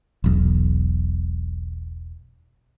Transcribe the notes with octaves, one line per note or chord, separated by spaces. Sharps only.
E1 B1